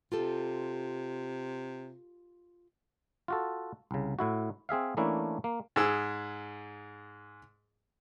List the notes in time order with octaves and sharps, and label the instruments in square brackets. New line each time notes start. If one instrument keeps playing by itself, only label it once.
[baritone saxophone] C3 [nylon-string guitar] F4 G4 A4
[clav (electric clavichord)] F4 F#4 A4
C2 C#3
A2 E4 F#4
C4 G#4 E5 F5
E3 A3 A#3 C#4 D4 E4
A#3
[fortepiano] G#2 G#4 E6